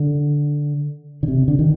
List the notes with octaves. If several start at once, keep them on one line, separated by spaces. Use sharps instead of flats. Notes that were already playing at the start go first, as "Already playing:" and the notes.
Already playing: D3
D3
C3
D3
D#3